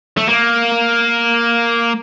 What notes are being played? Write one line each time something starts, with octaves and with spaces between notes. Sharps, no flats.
A3
A#3